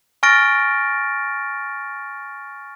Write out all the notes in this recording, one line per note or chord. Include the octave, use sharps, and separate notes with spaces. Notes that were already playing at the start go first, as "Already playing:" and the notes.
G#5 C#6 F6 A6 A#6 D7